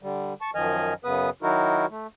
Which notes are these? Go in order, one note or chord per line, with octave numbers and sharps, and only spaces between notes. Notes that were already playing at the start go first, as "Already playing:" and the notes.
D3 G3
A5 C#6
F#2 D#3 F3 D#5 G#5 F6
F#2 C#3 B3 B4 D#6
D#3 F#3 D#4 E4 F#4 A#4
A3